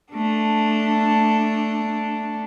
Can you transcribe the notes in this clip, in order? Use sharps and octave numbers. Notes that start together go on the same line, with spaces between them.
A3 D4